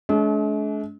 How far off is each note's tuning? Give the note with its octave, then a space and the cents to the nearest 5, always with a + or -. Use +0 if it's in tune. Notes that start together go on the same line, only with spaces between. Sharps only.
G#3 +45 D4 -40